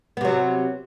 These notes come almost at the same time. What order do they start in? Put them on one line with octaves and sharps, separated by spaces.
B3 C3 F#3